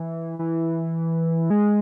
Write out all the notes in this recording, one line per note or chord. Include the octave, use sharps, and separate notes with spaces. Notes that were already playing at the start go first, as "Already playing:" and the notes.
Already playing: E3
E3
G#3